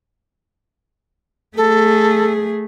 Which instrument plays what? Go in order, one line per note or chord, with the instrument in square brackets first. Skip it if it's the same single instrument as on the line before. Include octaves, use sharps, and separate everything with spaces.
[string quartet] A3 G#4 [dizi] A4